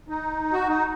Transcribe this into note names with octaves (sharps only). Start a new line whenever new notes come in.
D#4
F#4
D#4